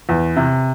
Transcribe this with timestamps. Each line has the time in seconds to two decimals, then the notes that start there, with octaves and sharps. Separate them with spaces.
0.09 E2
0.36 C3